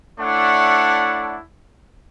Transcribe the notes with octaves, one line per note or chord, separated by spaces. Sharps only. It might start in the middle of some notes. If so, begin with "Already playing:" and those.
A3 D4 E4 C#5 D5 F#5